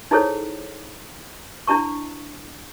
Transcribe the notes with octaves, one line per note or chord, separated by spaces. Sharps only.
D#4 E4 G#4 A4 C5 C#5
D4 E4 A5 C#6